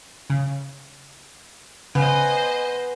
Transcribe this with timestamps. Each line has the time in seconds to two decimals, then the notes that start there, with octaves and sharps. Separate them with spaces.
0.30 C#3
1.95 C#3 B3 C5 D#5 G#5